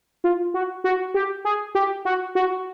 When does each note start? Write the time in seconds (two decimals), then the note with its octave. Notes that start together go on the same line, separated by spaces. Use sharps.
0.24 F4
0.54 F#4
0.84 F#4
1.14 G4
1.45 G#4
1.75 G4
2.05 F#4
2.35 F#4